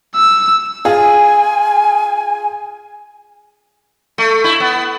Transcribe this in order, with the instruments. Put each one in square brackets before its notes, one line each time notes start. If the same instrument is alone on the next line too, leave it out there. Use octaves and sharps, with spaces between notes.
[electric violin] E6
[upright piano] F4 G#4 [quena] G#5
[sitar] A3
E4
B3